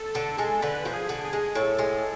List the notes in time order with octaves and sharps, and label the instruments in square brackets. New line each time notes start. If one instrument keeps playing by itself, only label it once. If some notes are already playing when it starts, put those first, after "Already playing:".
Already playing: [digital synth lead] A4
[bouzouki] D3
G#3
[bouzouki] D3 [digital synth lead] B4
[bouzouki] F3
[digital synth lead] G#4
[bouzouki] D3
[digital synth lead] G#4
[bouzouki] G#3
[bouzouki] A2 [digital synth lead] A4
[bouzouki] G#3